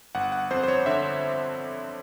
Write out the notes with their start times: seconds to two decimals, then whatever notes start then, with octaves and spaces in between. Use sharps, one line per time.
0.15 G1 F#5
0.32 F#5
0.51 F2 C5
0.63 C5
0.68 C#5
0.86 D3 E5